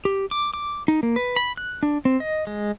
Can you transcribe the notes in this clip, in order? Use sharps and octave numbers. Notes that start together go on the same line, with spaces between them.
G4
D6
D6
D#4
A#3
B4
B5
F#6
D4
C4
D#5
G#3